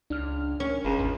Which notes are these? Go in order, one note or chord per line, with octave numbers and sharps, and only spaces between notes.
C#2 D4 F6
C#4
G1 C#2
G#1 E2